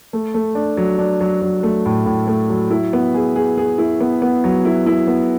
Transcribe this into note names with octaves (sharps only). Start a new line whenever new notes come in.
A3
A3
D4
F#3
D4
F#3
F#3
A3
A2
A2
A3
F#3
E4
B3
G#4
G#4
G#4
E4
B3
B3
F#3
E4
E4
B3